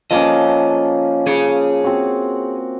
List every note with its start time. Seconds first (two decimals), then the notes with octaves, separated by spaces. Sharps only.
0.11 F3 A#3 C#4 A4 D#5
1.27 G#4 C#5
1.84 C4 F#4